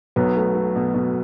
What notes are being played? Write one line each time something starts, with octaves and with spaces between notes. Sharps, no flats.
B1 F#3 B3
A3
A3
B2
B2